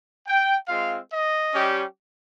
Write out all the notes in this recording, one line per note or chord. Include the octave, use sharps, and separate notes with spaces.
G5
G#3 C4 F4 F5
D#5
G3 C#4 G4